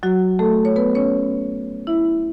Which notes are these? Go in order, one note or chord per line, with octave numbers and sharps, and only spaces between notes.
F#3 F#4
A3 A4
C#5
B3 B4
C#4 C#5
E4 E5